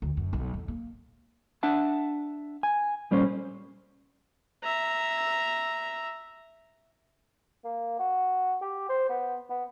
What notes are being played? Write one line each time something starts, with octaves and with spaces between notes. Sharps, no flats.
D2
F#2
B1
E2
A#3
D4 E5 F#5 A5
G#5
A#2 G3 C#4 C5
E5 A#5
A#3
F#4
G4
C5
B3
B3